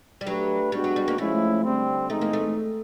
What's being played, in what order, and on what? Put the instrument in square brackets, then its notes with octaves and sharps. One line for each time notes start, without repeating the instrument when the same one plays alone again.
[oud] G3
[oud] F#3 [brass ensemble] A3 D4 G4 B4
[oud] G3 [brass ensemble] G#3 B3 D4 F#4
[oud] F#3
G3
A#3
[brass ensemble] F3 G#3 C#4 E4 [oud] A3
[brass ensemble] D3 G3 C4
[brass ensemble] E3 G#3 C4 D#4 [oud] A3
[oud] A#3
A3